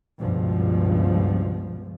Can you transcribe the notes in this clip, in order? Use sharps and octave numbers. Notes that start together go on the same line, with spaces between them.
C#2 G2 B2 F3